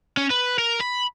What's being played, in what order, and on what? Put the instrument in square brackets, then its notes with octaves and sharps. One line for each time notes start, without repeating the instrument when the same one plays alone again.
[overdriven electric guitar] C#4
B4
A#4
B5